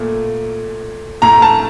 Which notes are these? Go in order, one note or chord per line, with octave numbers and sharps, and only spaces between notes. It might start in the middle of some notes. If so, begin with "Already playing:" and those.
Already playing: A#2 A3
A2 A3 A#5
A5